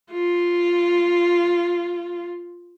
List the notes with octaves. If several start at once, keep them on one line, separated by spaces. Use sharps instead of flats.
F4